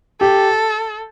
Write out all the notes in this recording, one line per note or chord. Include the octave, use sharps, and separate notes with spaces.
G4 A4